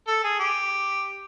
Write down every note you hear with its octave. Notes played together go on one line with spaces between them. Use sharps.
A4
G#4
G4